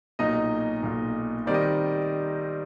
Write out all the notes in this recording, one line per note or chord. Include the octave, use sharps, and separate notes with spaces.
B1 A#2 F#3 D#4 D#5
B1 A#2 F#3
D#3 G3 C4 D#4 D5
D#5